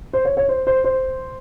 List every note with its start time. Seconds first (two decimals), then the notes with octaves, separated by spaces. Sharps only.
0.13 C5
0.25 C#5
0.37 C#5
0.49 C5
0.67 C5
0.84 C5